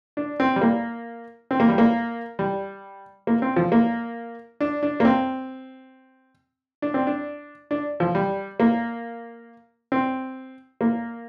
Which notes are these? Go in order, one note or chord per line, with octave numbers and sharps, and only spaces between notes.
D4
C4
G3
A#3
C4
A#3
G3
A#3
G3
A#3
C4
F3
A#3
D4
D4
A#3
C4
D4
C4
D4
D4
F3
G3
A#3
C4
A#3